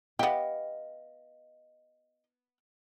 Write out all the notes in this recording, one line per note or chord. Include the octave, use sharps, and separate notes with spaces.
B3 G4 D#5 F5